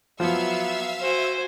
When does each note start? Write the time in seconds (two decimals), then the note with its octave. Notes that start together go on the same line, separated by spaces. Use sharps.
0.20 F3 F#3 B3 E5 F5 E6
1.01 F#4 C5 G#5